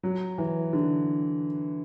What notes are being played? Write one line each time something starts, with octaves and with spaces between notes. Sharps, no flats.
F#3
E3
D3